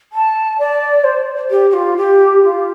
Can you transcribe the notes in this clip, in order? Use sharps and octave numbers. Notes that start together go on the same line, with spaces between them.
A5
D5
C5
G4
G4
F4
G4
F4